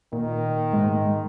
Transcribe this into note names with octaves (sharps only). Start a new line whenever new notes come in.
A#2 D#3
G#2 G#3